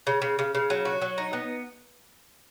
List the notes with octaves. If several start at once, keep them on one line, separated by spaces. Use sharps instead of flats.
C#3
C#3
C#3
C#3
F#3
F#4
F#3
D#4
B3